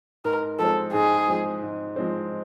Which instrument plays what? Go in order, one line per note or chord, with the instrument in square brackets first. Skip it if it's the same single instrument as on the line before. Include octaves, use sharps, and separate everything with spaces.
[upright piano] G#2 [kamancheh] A#4
[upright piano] F3 G#3 C4 [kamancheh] A4
[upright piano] G#2 [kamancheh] G#4
[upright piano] F3 G#3 C4
G#2
F3 G#3 C4